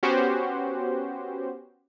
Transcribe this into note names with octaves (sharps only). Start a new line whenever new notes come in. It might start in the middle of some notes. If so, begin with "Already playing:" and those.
B3 C#4 F#4 G4 C5